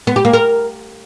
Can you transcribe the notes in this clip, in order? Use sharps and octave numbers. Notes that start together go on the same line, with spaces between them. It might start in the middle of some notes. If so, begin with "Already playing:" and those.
B3
G4
A#3
A#4